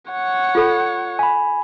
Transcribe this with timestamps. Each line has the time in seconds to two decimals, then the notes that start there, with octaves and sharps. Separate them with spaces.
0.11 C#5 F#5
0.55 F4 A4 B5
1.19 F5 G#5 B5